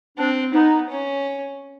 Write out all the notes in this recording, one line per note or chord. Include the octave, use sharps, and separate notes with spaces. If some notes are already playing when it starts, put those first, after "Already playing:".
C4 D4
B3 D#4
C#4